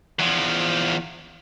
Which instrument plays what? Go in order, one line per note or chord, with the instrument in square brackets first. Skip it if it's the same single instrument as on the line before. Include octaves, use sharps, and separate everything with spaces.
[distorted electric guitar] E2 F3